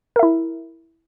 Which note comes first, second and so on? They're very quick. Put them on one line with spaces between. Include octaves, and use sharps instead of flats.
A#4 E5 E4